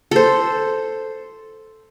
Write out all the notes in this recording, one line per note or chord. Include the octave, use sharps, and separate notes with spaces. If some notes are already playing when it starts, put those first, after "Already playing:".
A4 C5